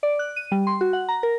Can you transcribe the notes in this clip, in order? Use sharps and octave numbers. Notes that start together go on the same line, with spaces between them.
D5
F#6
D#7
G3
C6
F#4
F#5
A#5
A#4